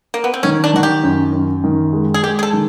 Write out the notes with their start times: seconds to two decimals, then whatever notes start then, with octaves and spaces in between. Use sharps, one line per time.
0.14 A#3
0.24 B3
0.34 C4
0.43 D#3 C#4
0.64 D4
0.74 D#3 F#4
0.83 G4
1.03 F#2
1.32 F#2
1.64 D#3
1.93 G#3
2.14 G#4
2.22 G#3 G4
2.39 G#4
2.43 A4
2.53 D#3